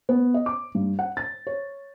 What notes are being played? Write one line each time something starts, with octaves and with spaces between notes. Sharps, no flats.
B3
D#5
D6
G2
F#5
A6
C#5